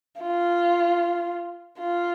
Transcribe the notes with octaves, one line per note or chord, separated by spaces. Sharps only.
F4
F4